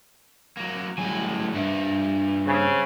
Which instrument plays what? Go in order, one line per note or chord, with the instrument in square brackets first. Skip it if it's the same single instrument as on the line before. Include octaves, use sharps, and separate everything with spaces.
[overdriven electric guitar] F#3 A#3
[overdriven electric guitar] A2 G#5 [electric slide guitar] F#3 G3 G#4
[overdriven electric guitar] G2 [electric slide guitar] A#3 D4 E5
[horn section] C#3 C4